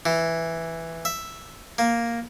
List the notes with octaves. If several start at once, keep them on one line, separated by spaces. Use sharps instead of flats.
E3
E5
A#3